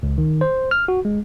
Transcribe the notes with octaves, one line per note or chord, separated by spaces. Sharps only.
C#2
D#3
C5
F6
F#4
G#3